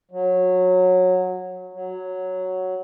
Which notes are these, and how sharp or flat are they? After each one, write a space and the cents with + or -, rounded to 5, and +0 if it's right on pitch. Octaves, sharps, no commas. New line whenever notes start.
F#3 -15
F#3 +0